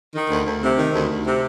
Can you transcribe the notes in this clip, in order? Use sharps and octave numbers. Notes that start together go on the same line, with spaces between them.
D#3
D2
D2
C3
D#3
D2
D2
C3